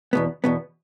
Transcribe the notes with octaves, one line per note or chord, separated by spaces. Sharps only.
E2 B2 B3
E2 B2 B3